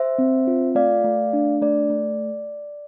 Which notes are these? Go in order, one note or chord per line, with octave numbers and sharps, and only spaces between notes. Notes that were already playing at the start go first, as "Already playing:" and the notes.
Already playing: C5 E5
C4
F4
A3 D5 F5
A3
D4
A3 D5
A3